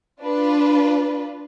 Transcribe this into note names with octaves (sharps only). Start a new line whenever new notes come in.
D4 F4 B4